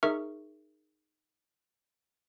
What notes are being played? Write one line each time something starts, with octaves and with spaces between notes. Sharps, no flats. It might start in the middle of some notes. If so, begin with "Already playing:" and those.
D#4 G#4 A#4 E5 C#6 F6